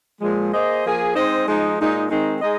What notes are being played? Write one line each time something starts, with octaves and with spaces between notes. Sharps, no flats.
A#2 F3 G#3
A#3 G#4 C5 D#5
F3 A#3 G#4
G#3 C4 D#4 C5 D#5
F3 G#3 D#4
A#2 G#3 D#4
D#3 G#3 C4 D#4
G#3 D#4 G#4 D#5